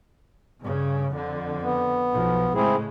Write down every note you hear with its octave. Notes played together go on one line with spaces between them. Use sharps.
G2 C#3
F2 D3
B3
B1 F3
A2 C#3 G#3 C4 E4 G#4